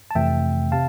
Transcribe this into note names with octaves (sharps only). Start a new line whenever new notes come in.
A5
F2 C3 E3 A3 E5 G5
C3 F5 A5